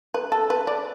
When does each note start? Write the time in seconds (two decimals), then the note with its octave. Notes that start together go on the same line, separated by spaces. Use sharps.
0.14 B4
0.32 A4
0.50 B4
0.67 D5